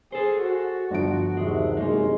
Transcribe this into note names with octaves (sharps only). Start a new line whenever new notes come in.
G#4 A4 C5
F#4
G1 F3 D7
D#2 C3 G#3 E5
F#1 C3 G#3 A#3 D#4